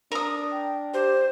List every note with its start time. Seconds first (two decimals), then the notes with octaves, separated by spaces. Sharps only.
0.12 D4 A#4 D#6
0.52 G5
0.94 G4 C5